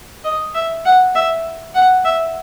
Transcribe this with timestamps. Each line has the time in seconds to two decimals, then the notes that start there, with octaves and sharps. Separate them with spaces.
0.24 D#5
0.54 E5
0.85 F#5
1.15 E5
1.75 F#5
2.05 E5